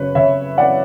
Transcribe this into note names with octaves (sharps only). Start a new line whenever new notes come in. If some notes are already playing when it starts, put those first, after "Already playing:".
Already playing: F#2 C#3 B4 C#5
C#3 C#5 E5
E3 D5 F#5